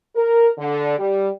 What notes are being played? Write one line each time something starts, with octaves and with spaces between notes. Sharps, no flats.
A#4
D3
G3